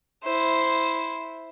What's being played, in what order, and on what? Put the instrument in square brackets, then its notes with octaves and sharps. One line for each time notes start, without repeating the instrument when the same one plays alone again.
[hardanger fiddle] E4 C5